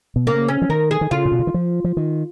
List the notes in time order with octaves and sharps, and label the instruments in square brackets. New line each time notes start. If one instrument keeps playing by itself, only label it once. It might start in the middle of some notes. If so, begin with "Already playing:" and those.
[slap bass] B2
[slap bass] C#3 [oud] A#3
[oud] C#4
[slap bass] F3
[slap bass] D#3 [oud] A#4
[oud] G#4
[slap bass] D#3
[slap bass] C#3 [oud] F4
[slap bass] A#2
B2
C#3
D#3
F3
F3
D#3